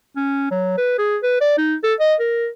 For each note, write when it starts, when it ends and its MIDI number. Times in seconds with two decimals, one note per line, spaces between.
0.16 0.48 61
0.51 0.75 54
0.78 0.97 71
0.99 1.18 68
1.23 1.40 71
1.41 1.58 74
1.58 1.75 63
1.84 1.94 69
2.00 2.15 75
2.20 2.48 70